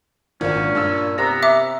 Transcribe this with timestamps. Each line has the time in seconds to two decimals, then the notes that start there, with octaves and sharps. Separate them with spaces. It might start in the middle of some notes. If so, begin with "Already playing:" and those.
0.41 G#1 A#2 C#4 D4
0.75 G2 F4 E6
1.18 C3 B3 A#5 E6 A#6
1.43 E5 D6